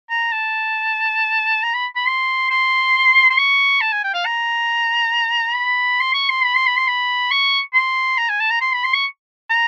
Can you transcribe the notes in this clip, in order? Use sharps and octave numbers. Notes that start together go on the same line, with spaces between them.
A#5
A5
A#5
B5
B5
C6
C6
C6
C#6
A5
G#5
G5
F5
A#5
B5
C6
C#6
C6
B5
C6
B5
C6
B5
C#6
C6
A#5
G#5
A5
A#5
C6
B5
C6
C#6
A#5